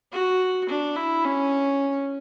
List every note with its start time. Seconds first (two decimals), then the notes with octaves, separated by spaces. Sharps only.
0.12 F#4
0.69 D4
0.96 E4
1.25 C#4